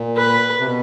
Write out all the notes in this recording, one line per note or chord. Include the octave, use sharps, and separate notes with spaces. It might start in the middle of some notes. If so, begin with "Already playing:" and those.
Already playing: A#2
B4
C3
B2